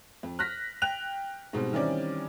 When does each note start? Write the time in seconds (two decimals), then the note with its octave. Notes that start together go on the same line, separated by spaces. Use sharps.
0.23 F2
0.39 F6 F#6 A#6 B6
0.82 G5 F#6 F7
1.53 G#2 B2 G3 C4
1.73 D#3 E3 G3 C4 C#4 D5